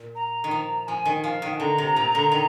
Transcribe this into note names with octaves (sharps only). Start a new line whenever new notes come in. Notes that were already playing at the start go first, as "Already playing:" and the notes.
Already playing: A#2
A#5
D#3
F3
F3 G#5
D#3
F3 F5
D#3
D3 A#5
C3
A#2
D3
D#3